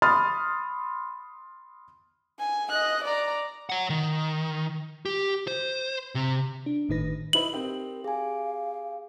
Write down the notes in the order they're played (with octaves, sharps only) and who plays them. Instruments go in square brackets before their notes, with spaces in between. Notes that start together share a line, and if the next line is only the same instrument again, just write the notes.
[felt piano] B5 C6 D#6 F6 A6
[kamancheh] G#5
D#5 F#6
D5 A#5
[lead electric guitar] C#5 F#5
D#3
G4
C5
C3
[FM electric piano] D4
G1 A2 D#3 D#4 B4 A#6
[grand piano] D#4 E4 B4 [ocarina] D#5 [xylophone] F#7
[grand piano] C4 D#4 G4 [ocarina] A#4
[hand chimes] G#4 G#5 [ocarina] F5